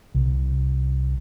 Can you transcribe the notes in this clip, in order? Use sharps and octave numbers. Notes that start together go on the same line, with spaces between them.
C2